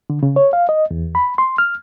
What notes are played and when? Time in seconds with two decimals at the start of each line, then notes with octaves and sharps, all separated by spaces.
0.10 D3
0.23 C#3
0.36 C#5
0.53 F5
0.69 D#5
0.91 E2
1.15 B5
1.38 C6
1.58 F6